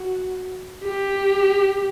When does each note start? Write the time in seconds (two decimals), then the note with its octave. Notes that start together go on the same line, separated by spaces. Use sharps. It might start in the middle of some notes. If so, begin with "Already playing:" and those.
Already playing: F#4
0.84 G4